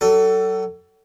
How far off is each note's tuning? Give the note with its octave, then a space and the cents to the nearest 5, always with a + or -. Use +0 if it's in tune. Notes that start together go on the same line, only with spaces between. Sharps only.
F#3 +40 A4 +20